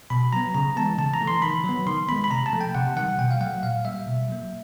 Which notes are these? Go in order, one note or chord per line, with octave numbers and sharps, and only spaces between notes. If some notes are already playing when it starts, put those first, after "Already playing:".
B2 B5
F#3 B3 A#5
C#3 A#5
E3 G#3 B3 A5
C#3 A5
A#5
E3 A3
C6
D#3 B5
F#3 B3
D#3 C6
G#3 B3 B5
B5
C3 A#5
A5
F3 A3
G5
C3 F#5
D#3 G3 F#5
B2 G5
F5
F#3 A3 F#5
A#2 F5
G3 A#3 E5
B2
F#3 A#3